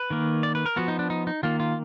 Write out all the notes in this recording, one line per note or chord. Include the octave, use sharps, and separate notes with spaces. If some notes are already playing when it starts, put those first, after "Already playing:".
Already playing: B4
D#3 A#3
D5
B4
A#4
F3 B3 F#4
D#4
D4
D#4
D#4
D#3 A#3 F4
F4